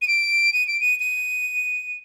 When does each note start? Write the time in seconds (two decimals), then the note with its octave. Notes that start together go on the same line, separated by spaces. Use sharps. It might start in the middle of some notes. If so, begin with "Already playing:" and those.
0.02 D#7
0.08 D7
0.53 D#7
0.68 D7
0.80 D#7
1.00 D#7